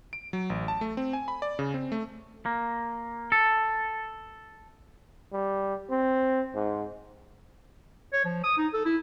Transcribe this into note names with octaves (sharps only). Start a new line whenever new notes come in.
D7
F#3
A1
A5
A3
C4
G#5
B5
D5
C#3
C4
A3
A#3
A4
G3
C4
G#2
C#5
F3
D#6
D#4
A4
E4